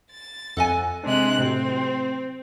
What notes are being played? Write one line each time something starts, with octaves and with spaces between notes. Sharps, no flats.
A6
F2 A4 D#5 F#5 G#5
C3 G#3 D4 F#6
A2 C3 F#3 C4